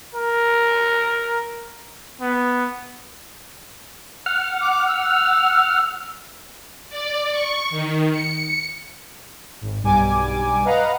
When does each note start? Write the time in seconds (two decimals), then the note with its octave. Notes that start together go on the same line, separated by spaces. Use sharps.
0.15 A#4
2.21 B3
4.26 F#5 F6
4.61 D6
4.88 E6
6.89 D5
7.31 C#6
7.70 D#3
8.11 C#7
9.61 G#1
9.82 B1 G2 G3 G#5 D6
10.65 B4 D#5 F5 F#5 A#5